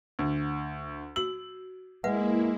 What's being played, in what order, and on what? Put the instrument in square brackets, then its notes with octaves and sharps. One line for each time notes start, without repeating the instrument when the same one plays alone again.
[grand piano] D2
[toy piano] F#4 E6 [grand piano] F#7
[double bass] G#3 [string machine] A#3 E4 [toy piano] B4 E5 F#5